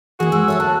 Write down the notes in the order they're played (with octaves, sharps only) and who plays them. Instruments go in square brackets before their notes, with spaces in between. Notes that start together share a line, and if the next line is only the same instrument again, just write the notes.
[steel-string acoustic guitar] E3 A#3 [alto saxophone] F#4 [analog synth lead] G#4
[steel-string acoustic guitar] G#3 C4 [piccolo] E6
[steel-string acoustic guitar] G3 A4 C#5 [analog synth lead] A3
[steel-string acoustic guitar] D#2 [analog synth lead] A4 [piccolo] F#6